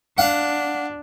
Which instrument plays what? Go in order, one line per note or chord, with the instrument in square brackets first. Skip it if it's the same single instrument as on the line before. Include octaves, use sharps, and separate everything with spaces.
[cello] D4 [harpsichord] F5 F#5